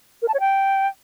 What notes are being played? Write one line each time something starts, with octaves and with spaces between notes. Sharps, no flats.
A#4
A5
C#5
G5